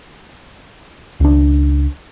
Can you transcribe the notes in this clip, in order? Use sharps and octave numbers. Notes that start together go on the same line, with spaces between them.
C#2 D4